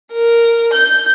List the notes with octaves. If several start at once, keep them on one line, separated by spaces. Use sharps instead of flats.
A#4
G6